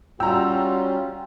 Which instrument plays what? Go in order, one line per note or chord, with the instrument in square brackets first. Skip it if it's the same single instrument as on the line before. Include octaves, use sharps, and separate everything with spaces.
[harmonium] G3 C#4 F4 [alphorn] F#4 [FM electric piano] G5 [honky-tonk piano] A#5 E6